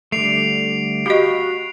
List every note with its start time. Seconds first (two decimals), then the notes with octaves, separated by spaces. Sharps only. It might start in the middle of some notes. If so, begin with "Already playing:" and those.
0.12 D3 G3 A3 C7 D7 F7
1.06 F#4 G4 D#5 F5 G5 B5